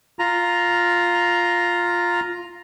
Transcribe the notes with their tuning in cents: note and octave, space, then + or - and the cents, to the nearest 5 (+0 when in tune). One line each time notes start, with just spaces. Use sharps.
F4 +0 A#5 +0